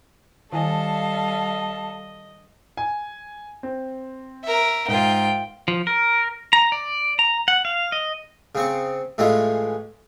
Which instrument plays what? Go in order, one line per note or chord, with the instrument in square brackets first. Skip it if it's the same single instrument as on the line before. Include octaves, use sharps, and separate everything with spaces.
[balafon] D#3 E4 G#5 [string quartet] G3 A4 F5 [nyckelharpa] D#5 [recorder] A5
[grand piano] G#5
C4
[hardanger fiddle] A#4 E5
[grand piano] G#2 [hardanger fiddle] F4 G5
[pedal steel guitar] F3
A#4
A#5
D5
A#5
F#5
F5
D#5
[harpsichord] C#3 C4 C#6
A2 E3 G#3 A3 C#4 F4